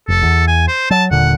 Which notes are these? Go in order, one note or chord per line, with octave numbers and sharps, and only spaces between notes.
F1 A4
E2
G#5
C5
F#3 A5
D#1 A#2 D3 F#5